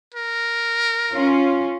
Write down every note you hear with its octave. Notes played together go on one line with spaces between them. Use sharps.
A#4
C#4 F4